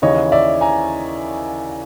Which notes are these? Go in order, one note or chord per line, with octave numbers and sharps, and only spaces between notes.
D#2 C#3 E3 C#5 D#5
D5 E5
G#5 A#5